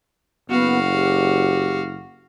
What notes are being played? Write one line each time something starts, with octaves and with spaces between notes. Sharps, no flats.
F#1 B3 F#4 F5
G4